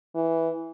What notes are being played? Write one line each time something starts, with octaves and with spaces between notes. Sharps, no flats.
E3